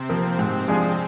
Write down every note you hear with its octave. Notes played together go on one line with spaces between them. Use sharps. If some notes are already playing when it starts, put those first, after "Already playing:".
Already playing: C3 C4
F3 A#3
G#2
F3 G#3 D4 G#4